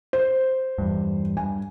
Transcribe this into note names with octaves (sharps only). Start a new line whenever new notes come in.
C5
E2 G2
G2 G#5